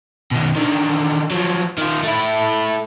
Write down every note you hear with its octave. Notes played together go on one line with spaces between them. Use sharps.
B2 D#3
D3 D#3
F3 F#3
D#3 F4
A3 E4